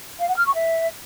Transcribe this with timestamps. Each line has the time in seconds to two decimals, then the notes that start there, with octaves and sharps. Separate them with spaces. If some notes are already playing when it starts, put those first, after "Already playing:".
0.20 F5
0.28 F#5
0.37 F6
0.46 C#6
0.55 E5